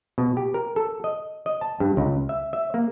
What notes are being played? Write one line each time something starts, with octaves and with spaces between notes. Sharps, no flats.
B2
G4
A#4
A4
D#5
D#5
A5
G2
C#2
E5
E5
A#3